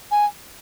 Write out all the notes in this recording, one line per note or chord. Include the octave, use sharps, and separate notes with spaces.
G#5